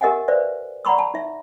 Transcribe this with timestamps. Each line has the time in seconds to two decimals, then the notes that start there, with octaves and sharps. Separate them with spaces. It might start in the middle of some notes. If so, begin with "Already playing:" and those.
0.01 G4 A#4 D#5 E5 F#5 G#5
0.28 B4 C5 D5 E5 F5
0.85 D5 F#5 A#5 B5 C#6 E6
0.98 A5
1.14 D#4 E5